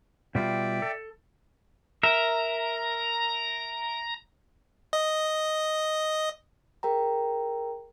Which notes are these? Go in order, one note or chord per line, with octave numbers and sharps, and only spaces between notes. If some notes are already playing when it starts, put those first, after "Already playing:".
B2 G3 F4 D5 E5 G5
A4
A#4 E5 A#5
D#5
G#4 A#4 G5 A#5